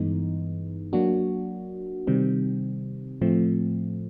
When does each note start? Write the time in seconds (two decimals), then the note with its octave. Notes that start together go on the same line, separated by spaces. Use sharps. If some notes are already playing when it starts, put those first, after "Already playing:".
Already playing: G2 E3 G#3 B3 D#4
0.93 F#3 A#3 D4 F#4
2.07 C3 D#3 G3 C4
3.21 A2 F3 A3 C4